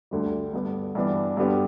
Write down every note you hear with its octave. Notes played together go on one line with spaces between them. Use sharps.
D2 D3 G3
G2 D3 B3 D4
G2 E3 B3 D4
G2 D3 G3 B3 G4